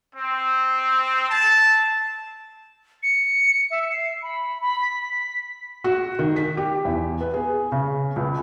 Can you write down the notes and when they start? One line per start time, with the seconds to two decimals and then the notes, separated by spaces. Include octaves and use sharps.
0.14 C4
1.29 A5
3.03 C#7
3.71 E5
3.92 C7
4.22 B5
4.61 B5
4.81 B6
5.84 F#4
6.19 D#3
6.36 B6
6.57 G4
6.85 E2
7.21 B3
7.34 G#4
7.72 C#3
8.16 C#2